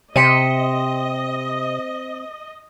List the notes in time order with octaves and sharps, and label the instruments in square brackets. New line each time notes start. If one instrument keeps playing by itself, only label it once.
[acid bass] C3 [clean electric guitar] C4 [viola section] D#5 [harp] B6 C#7 D#7